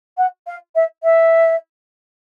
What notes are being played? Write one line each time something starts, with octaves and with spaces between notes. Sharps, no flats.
F#5
F5
E5
E5